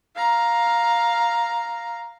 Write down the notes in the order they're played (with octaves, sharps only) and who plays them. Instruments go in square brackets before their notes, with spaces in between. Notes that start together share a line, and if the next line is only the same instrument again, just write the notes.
[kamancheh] F5 A#5